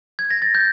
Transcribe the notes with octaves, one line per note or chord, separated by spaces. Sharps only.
G#6
A#6
A6
G6